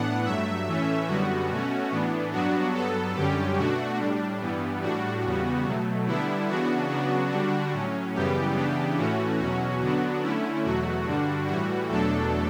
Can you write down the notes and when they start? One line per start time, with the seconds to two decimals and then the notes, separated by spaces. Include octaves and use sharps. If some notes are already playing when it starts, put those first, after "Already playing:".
Already playing: A2 E3 B3 D4 F#5
0.24 G2 F#3 A3 E5
0.66 A2 E3 A3 C#4
1.07 F#2 D3 G3 B3 F#4
1.49 B2 A3 C#4
1.91 A2 E3 B3 D4
2.32 G2 F#3 B3 D4 F#4
2.74 G2 F#3 B3 A4
3.15 F#2 D3 G3 C#4 G4
3.57 B2 A3 D4 F#4
3.99 A2 G3 D4
4.40 G2 E3 G3 B3
4.82 A2 G3 D4 F#4
5.23 E2 C#3 G3 B3
5.65 B2 F#3 A3
6.07 D3 G3 B3 D4 E4
6.48 C#3 E3 B3 D4 F#4
6.90 C#3 F#3 B3 D4
7.31 D3 G3 D4
7.73 A2 F#3 C#4
8.14 F#2 C#3 E3 G3 B3 G4
8.56 C#3 E3 B3 D4
8.97 A2 E3 A3 C#4 F#4
9.39 E2 B2 F#3 C#4 F#4
9.81 D3 F#3 B3 D4
10.22 D3 A3 C#4 E4
10.64 E2 B2 F#3 A3 F#4
11.06 G2 D3 G3 D4
11.47 A2 E3 G3 F#4
11.89 E2 B2 F#3 A3 D4 A4